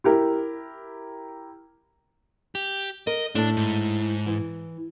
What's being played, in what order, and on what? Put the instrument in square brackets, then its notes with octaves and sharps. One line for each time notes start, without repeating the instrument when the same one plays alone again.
[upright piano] E4 G4 A#4
[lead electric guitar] G4
[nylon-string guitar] A#4 [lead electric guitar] D#5
[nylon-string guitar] A2 A5 [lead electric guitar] D4
[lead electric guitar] G#2
[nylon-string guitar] E3